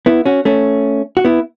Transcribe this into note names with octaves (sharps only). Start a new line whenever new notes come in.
B3 E4
C#4 F#4
A3 C#4
F#4
B3 E4